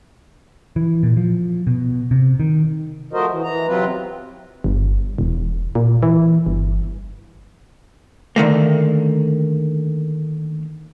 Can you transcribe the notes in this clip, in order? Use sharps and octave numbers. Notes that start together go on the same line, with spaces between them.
E3
A#2
F3
B2
C3
D#3
F3 A3 F#4 A#4 C5 D#5
E3
E3 A#5
C3 F#3 C4 F4 B4
G1
E1
A#2
E3
G1
D3 D#3 A3 A#3